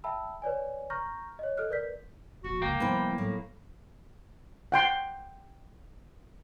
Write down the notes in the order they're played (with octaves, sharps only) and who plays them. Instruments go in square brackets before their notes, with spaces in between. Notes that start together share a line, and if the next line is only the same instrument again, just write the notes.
[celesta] E5 G5 A5 B5 E6
B4 C#5 D5 G#5
A#5 C#6 F6 G6 A#6
C#5 D#5
A4 D#5 F6 F#6
A#4 B4 D5 G6 B6
[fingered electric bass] E1 A#1 [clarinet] F#4
[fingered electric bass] F1 C#2 [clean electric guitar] A#3 [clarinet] G5
[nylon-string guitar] C3 E3 B4 [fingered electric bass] F3 G3 B3
[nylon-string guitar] A2 [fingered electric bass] F#3 G3 B3
[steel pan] F#5 G5 C6